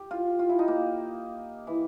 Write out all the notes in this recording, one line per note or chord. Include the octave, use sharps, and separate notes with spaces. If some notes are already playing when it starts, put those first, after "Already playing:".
Already playing: G4
F4
F4
E4
D#4
A#3
E3